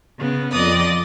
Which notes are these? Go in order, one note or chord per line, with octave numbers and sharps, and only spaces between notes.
C#3 B3
F2 D5 D#5 D#6